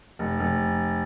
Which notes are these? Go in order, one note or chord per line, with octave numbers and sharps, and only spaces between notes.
F1
F1